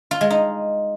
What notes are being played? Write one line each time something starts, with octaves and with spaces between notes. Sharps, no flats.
F4
G#3
D#4